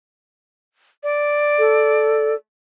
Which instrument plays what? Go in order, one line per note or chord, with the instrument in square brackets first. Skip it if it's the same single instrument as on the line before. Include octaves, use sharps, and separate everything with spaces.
[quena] D5
[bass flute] A4